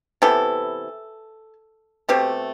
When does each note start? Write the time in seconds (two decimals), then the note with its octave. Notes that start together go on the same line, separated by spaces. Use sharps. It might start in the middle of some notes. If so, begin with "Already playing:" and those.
0.22 C3 E3 B3 A4
2.09 B2 A3 C4 G4